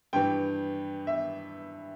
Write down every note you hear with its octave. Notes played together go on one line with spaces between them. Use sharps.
G2 E3 G5
E5